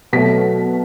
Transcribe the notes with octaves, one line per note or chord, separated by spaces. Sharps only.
B2 F#3 A3 B6